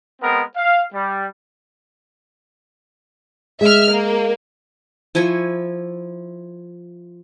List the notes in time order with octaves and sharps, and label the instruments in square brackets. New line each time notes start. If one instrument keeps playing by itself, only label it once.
[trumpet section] G#3 B3 C4 A#4
F5
G3
[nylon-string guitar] G#3 [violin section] E5 F6
[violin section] A#3
[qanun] F3 E4 G#5 C#6